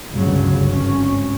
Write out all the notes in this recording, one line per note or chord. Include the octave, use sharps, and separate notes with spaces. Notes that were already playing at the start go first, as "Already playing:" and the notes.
G1 C#2 G2 C#3 F#3
G#1 C#4